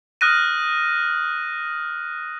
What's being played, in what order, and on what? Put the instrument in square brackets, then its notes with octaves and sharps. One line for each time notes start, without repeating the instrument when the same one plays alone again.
[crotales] D#6 F6 F#6 A#6 D#7